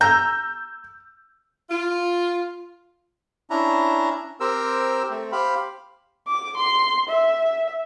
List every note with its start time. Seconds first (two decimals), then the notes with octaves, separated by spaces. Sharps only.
0.01 A#5 E6 G6
1.70 F4
3.50 C#4 D4 E4 A#5
4.40 C4 G4 A#4 C5 E6
5.10 A3 C4
5.32 G4 C5 F5 B5
6.28 D6
6.57 C6
7.09 E5